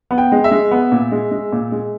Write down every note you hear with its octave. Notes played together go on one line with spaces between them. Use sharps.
B3
G5
G#3
E5
G#3
B3
A#2
G#3
G#3
A#2
G#3